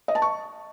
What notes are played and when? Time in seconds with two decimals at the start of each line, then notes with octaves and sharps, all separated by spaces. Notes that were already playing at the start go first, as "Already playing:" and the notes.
0.08 D#5
0.15 A5
0.22 C#6